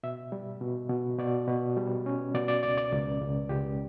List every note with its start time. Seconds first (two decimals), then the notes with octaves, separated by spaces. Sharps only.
0.03 B2 E5
0.32 G3
0.61 B2
0.89 B2
1.18 B2 D5
1.47 B2
1.77 G3
2.06 C#4
2.35 B2 D5
2.48 D5
2.63 C#2 D5
2.77 D5
2.93 C#2
3.22 C#2
3.49 C#2 G4